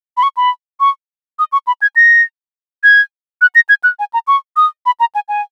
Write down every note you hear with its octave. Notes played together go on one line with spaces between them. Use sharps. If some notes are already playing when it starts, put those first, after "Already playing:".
B5
C#6
B5
C#6
D#6
C#6
B5
G#6
A#6
G#6
F#6
A#6
G#6
F#6
G#5
A#5
C#6
D#6
B5
A#5
G#5
G#5